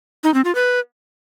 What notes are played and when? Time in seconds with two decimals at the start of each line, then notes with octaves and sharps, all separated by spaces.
0.24 D#4
0.34 C4
0.45 F4
0.55 B4